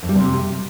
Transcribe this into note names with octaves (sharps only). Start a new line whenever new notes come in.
F2
G3
C3